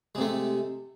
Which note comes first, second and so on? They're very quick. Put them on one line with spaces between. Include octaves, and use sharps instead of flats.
G#3 C3 A3